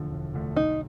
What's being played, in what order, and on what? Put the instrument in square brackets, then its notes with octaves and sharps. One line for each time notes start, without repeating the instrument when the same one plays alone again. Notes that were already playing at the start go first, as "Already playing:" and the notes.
Already playing: [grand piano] E1 D2 D3 F3 A3
E1
D2 D3 F3 A3
[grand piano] B1 [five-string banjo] D#4